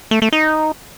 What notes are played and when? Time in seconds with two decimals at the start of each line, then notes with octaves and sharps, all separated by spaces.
0.11 A3
0.22 A3
0.33 D#4